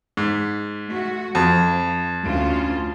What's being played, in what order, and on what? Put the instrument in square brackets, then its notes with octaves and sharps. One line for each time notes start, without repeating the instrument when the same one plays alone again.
[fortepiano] G#2
[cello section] A3 F#4
[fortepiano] F2 [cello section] F3
[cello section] D2 C#4 F4